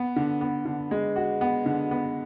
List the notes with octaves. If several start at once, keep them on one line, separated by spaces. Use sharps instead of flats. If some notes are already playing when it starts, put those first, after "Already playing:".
Already playing: B3
D3
B3
D3
G#3
F#4
B3
D3
B3